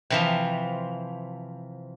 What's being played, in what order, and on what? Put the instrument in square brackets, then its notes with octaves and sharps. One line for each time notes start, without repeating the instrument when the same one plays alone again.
[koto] C3 E3 F3